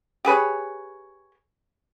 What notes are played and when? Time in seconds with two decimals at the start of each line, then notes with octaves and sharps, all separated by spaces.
0.25 G4 G#4 B4 C#5